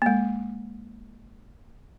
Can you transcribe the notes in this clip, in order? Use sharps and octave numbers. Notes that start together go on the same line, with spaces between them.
G#3 A#3